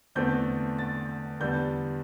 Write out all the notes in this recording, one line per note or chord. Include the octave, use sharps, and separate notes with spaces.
E2 D3 A3 C4 G6
A6
E2 D3 G3 G6